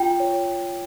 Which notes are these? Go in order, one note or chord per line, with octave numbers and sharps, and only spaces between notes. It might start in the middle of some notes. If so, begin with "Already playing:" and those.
Already playing: F4 G5
C#5